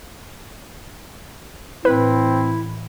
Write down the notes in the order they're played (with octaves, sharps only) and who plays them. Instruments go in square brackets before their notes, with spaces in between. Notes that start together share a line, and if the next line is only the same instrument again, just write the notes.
[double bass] A2 E3 [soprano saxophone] C4 [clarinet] E4 [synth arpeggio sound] B4